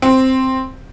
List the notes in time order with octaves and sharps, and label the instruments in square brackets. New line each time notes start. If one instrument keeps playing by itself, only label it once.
[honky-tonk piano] C4